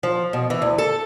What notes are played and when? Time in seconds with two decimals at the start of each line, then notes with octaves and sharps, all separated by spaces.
0.03 F3
0.33 B2
0.50 E3
0.62 D2
0.78 A4